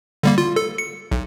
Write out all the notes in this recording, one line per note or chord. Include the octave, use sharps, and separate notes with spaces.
D3 G3 A#3
F4
A4
C#7
B1